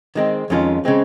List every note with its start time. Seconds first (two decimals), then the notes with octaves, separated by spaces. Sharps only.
0.15 D#3 G#3 C4
0.50 F2 D#3 G#3 C#4 F4
0.85 C#3 G#3 C4